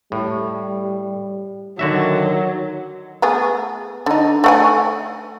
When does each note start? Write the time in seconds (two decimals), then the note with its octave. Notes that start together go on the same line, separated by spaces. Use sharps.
0.12 A2 G3
1.79 D3 D#3 F#3 F#4 E5
3.22 A3 B3 G#4
4.06 D3 D#4
4.44 A3 F#5 G#5